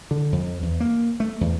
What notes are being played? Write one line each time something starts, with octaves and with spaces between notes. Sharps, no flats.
D3
F2
E2
A#3
A3
E2